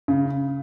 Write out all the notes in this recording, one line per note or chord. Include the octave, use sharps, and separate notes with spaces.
C#3